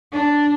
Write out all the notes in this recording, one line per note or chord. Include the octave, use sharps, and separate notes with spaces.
D4